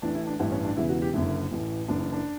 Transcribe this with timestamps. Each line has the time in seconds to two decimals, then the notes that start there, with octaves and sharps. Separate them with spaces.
0.02 A1 A2 E3 D4
0.15 E4
0.27 D4
0.39 A1 G2 E3 E4
0.52 C#4
0.64 D4
0.77 E1 E2 C#3 E3 E4
0.89 F#4
1.02 G4
1.14 F#1 F#2 D3 E4
1.51 A1 A2 E3
1.88 F#1 F#2 E3 D4
2.00 D4
2.13 D4